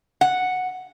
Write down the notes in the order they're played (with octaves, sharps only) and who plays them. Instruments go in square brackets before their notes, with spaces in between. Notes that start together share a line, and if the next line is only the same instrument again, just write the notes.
[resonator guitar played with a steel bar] F#5